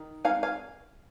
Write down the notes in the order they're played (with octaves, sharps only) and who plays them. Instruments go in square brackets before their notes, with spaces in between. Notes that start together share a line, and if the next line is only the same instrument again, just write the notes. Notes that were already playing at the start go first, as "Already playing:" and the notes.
Already playing: [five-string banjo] D#3
G#3 C4 D#4 F5 G#5
F5 G#5